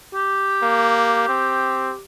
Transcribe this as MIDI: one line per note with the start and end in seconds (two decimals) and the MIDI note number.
0.14 2.05 67
0.62 1.25 58
1.28 1.93 60